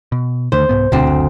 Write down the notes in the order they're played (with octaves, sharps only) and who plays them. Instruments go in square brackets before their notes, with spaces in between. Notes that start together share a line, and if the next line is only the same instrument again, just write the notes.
[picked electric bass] B2
[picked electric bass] D#2 D3 A3 [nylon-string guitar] C5
[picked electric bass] C2 G#2 B3
[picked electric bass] E1 B2 D4 [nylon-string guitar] D2 C4
[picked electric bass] F#1